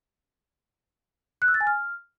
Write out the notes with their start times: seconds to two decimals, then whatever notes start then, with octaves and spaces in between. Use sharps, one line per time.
1.42 F#6
1.48 E6
1.54 A6
1.61 G#5
1.67 F6